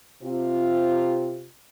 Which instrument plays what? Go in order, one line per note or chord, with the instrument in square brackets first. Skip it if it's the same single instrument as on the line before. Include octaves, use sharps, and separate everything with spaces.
[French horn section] C3 C4 F4